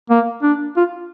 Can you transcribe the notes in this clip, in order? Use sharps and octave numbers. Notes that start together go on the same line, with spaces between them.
A#3
D4
F4